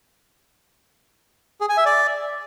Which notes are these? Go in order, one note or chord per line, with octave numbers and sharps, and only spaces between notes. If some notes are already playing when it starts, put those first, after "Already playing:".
G#4
G#5
E5
D5